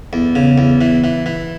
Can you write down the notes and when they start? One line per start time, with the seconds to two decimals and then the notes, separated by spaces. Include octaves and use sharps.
0.13 E2
0.35 C#3
0.58 E2
0.81 E3
1.04 E3
1.26 E3